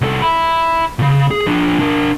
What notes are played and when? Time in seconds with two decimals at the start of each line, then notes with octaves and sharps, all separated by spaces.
0.01 C2 A4
0.22 E5 B5
0.99 A#2 C#3
1.31 G#4
1.46 F3 D4
1.79 D4 A#4